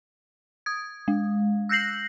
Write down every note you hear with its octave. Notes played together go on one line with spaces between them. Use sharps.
D#6 G#6
G#3
E6 F#6 G6 A#6 C7 F#7